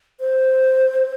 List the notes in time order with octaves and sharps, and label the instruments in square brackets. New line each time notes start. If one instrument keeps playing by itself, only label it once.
[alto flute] C5